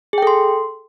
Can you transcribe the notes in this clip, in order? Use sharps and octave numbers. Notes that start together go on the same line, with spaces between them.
G#4 A4 G5 C6